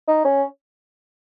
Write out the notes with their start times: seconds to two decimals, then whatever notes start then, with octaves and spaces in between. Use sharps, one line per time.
0.08 D#4
0.25 C#4